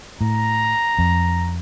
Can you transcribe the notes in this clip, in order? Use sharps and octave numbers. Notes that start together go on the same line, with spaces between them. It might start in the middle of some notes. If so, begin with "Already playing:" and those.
A2 A#5
F2